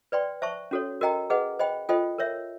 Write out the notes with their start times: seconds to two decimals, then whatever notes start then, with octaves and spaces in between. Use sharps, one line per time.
0.12 B4 D5 G5 C6
0.42 C5 E5 A5 C#6
0.71 C#4 F#4 A4 C#5
1.01 F#4 A#4 D#5 G5 A#5
1.30 G#4 B4 D#5 F#5
1.59 C5 D#5 G5 B5
1.89 F4 A4 C5 D#5 G5
2.18 A#4 C#5 E5